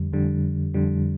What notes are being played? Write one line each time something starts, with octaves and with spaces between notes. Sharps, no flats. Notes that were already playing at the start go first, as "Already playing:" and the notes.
Already playing: F2 D3 G3
F2 D3 G3
F2 D3 G3